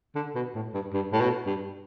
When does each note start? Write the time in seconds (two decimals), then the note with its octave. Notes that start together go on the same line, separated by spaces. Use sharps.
0.15 D3
0.35 B2
0.55 A2
0.74 G2
0.93 G2
1.13 A2
1.20 B2
1.46 G2